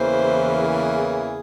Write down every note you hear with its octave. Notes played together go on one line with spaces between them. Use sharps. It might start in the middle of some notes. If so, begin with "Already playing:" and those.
Already playing: E2 C#3 E3 A#3 C5
G#4